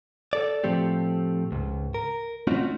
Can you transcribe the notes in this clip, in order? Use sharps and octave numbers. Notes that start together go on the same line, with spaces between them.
A4 D5
A2 F3 A3 C4 G4
C#2 G#2
A#4
A3 C4 C#4 D#4 F4 F#4